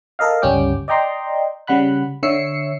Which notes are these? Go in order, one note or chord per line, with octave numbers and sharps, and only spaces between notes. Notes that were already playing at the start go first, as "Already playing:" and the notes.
A4 A#4 D#5 F5
G1 C#2 G3 C#4 G5 D6
D5 D#5 G5 A#5 C6
C#3 G3 F#5 B5 F#6
D3 C#5 E5 E6 C7 C#7